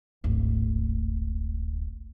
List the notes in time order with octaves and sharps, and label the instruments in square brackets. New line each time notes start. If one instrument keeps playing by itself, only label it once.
[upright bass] D1 G#1